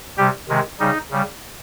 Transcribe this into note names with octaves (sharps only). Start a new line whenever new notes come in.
C3 G3 G4
C3 D#3 G#3
C#3 G3 D#4
C#3 G3